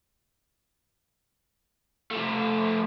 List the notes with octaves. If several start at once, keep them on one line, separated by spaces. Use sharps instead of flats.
F3 A3